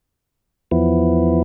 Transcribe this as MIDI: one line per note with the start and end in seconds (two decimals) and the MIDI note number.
0.71 1.43 40
0.71 1.43 53
0.71 1.43 59
0.71 1.43 64